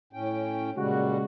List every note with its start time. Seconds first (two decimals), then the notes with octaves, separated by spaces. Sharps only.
0.13 A2 C#4 G5
0.77 A#2 C#3 G3 G#3 F#4